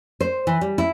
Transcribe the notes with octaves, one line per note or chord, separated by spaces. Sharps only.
C5
E3
G3
E4